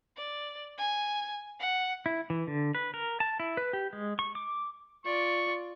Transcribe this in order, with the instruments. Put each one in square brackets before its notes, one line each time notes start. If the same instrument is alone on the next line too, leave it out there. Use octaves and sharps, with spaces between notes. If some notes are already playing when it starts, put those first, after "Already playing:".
[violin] D5
G#5
F#5
[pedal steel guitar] E4
E3
D3
B4
A#4
A5
E4
B4
G4
G#3
C#6
D6
[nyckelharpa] F4 D5 [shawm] C#6